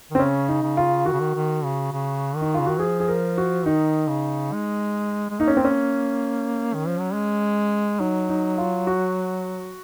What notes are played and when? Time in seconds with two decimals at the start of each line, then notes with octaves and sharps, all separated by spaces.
0.11 D#3
0.15 C4
0.19 C#3 C#4
0.48 D#4
0.62 C#3
0.77 F4
1.06 D#3 F#4
1.13 C#3
1.20 D#3
1.35 D#3
1.64 C#3
1.93 C#3
2.36 D#3
2.41 D#4
2.54 F4
2.59 C#3
2.66 D#3 F#4
2.79 F3 G#4
3.00 G#4
3.08 A#4
3.38 F#4
3.66 D#3 D#4
4.09 C#3
4.53 G#3
5.30 G#3
5.40 A#3 D#4
5.48 C#4
5.57 C4
5.64 C#4
6.74 D#3
6.87 F3
7.00 F#3
7.14 G#3
7.99 F#3 D#4
8.29 D#4
8.58 F4
8.87 F#4